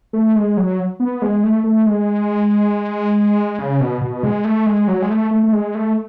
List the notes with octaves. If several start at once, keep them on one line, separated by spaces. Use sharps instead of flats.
A3
G#3
F#3
B3
G#3
A3
A3
G#3
C#3
B2
B2
G#3
A3
G#3
F#3
G#3
A3
A3
A3
G#3
A3